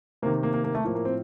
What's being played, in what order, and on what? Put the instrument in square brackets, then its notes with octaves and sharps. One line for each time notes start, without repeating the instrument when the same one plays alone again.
[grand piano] C3 A#3
D#3
A#3
A#3
A#3
A3
A2 F3 A#3
A#3
C4